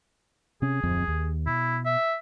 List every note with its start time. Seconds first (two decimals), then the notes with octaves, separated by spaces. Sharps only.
0.62 C3 C#4 G#4
0.83 D1 F2 C4
1.08 D#2
1.47 B2 E4
1.86 E5